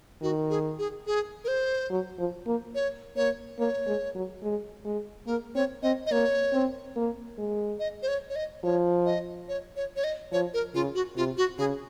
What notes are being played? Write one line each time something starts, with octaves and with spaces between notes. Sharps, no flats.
D#3 F#4
G#4
G#4
G#4
A#4
C5
F#3
F3
A#3
C#5
A#3 C#5
A#3 C#5
G#3
F#3
G#3
G#3
A#3 A#4
C4 C#5
C4 D#5
D#5
A#3 C#5
C4
A#3
G#3
D#5
C5
C#5
C#5
D#5
F3 C#5
D#5
C#5
C#5
C#5
D#5
F3 C#5
A#4
C#3 F4
F#4
C3 F4
F#4
C#3 G#4